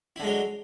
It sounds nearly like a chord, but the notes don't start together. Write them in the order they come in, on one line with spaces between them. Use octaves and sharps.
E4 D3 G#3 F#3